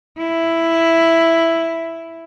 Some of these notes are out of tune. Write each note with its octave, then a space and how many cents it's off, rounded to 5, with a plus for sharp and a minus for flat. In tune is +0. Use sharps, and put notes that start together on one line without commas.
E4 +5